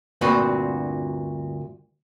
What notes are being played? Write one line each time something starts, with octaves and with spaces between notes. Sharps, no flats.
D2 G2 A#2 C4 F#4 B4